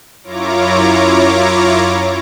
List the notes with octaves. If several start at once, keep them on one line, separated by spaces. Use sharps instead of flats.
F#2 E4 F4 C#5 A#5 D6